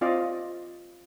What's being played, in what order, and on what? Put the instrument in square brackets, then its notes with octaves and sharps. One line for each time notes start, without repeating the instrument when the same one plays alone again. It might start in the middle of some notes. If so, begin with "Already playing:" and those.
[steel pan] C4 F4 D5 D#5 F5